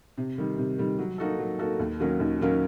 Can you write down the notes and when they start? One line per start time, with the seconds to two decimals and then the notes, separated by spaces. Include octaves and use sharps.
0.18 C3
0.38 D#3 G3
0.58 C3
0.78 D#3 G3
0.99 F#3
1.18 A#3 D#4 F#4 A4
1.39 F#3
1.59 A#3 D#4 F#4 A4
1.79 D#2
2.00 D#3 F#3 A#3 C#4
2.20 D#2
2.40 D#3 F#3 A#3 C#4